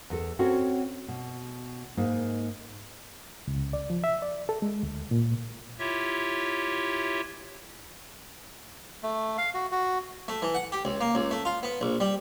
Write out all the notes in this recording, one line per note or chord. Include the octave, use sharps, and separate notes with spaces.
E2 A4
C4 C#4 F#4 A4 C#5
B2
G#2 A#3 D#4
C#2
D5
F3
E5
D5
A4
G#3
D2
A#2
E4 F4 G4 C#5 E5
A3
F5
F#4
F#4
A3
E3
F#5
G4
C#2
A#3
C#2
A3
F4
B3
A#1
G3